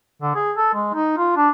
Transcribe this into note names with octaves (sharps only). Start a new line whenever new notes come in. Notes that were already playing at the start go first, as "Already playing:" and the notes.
D3
G#4
A4
G#3
D#4
F4
D4